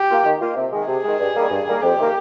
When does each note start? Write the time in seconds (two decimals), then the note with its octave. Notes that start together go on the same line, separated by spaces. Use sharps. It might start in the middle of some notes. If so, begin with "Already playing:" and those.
Already playing: G4
0.09 A#3 F4
0.25 D#3
0.40 A#3 F4
0.56 C3
0.71 D#3 G#3
0.87 C3 G#4
1.03 D#3 G#3
1.18 G2
1.34 D#3 G3 A#3
1.50 G2
1.65 D#3 G3 A#3
1.82 F2 G4
1.97 C3 D#3 A#3